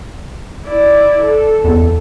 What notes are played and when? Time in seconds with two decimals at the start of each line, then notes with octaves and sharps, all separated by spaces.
0.65 E4 D5
1.21 A4
1.64 E2